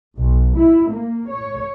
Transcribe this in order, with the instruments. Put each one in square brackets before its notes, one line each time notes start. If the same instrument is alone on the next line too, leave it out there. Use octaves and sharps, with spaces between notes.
[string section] B1
E4
A#3
C#5